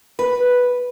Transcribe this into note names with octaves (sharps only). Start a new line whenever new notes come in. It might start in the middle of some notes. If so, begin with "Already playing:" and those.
B4